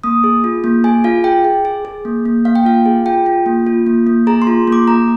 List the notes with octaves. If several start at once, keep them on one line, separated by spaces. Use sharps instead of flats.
A#3 D#6
G#4
F4
A#3
G#4 G#5
F4 F5
G#4 G5
G#4
G#4
G#4
A#3
A#3
A#3 F5
G5
F4 F5
G#4
F4 G5
F4
A#3
F4
A#3
A#3
G#4 A#5
C6
F4
A#3 D6
A#3 A#5